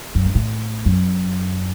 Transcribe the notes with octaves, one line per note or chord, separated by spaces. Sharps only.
F#2
G2
A2
F#2